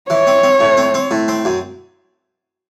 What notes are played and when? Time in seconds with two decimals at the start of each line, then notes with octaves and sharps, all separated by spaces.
0.10 E3 C#5
0.27 C4
0.43 C4
0.61 A2
0.77 C4
0.94 C4
1.11 A2
1.28 C4
1.45 F#2